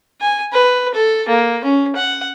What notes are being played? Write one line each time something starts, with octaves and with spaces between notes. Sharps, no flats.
G#5
B4
A4
A#3
C#4
F#5